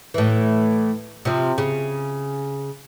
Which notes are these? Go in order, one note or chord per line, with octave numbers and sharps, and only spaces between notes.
A2 E3
C3 F3
C#3